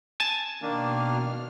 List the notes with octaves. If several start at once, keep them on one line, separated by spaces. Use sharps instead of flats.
G#5 A5
B2 D#3 A#3 D4 F6